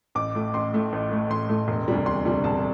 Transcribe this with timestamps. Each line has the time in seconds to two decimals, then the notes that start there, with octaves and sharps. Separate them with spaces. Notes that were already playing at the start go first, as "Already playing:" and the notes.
0.15 A1 D6
0.35 A2 A3
0.54 A1 C6
0.73 A2 A3
0.93 A1
1.12 A2 A3
1.30 A1 C6
1.49 A2 A3
1.68 E1
1.88 D2 C3 G3
2.06 E1 C6
2.25 D2 C3 G3
2.44 E1 A5